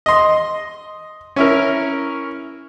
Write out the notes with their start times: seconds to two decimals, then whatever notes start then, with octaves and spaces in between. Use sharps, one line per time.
0.06 D#5 C6
1.36 C#4 E4 A#4